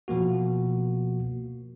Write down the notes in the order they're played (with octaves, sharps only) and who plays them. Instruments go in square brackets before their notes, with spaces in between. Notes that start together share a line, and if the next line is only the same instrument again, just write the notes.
[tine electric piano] B2 F3 A#3 F#4